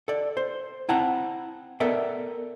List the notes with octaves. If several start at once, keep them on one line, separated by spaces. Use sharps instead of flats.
A4 D5
C5
C4 E4 F#5 A5 A#5
B3 A4 A#4 D5 E5